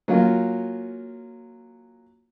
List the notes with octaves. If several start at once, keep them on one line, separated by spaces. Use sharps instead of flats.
F#3 A#3 C#4 F4